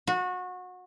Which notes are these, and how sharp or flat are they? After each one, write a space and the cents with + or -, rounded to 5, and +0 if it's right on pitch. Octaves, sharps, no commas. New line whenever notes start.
F#4 -25